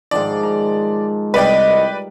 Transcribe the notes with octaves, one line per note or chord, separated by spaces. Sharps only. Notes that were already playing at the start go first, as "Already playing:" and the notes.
G#2 D#3 F3 D5
A#5
C2 G3 B4 D5 D#5 G5